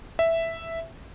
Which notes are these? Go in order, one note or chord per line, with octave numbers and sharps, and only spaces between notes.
E5